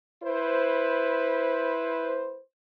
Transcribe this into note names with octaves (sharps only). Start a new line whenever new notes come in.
E4 B4 C5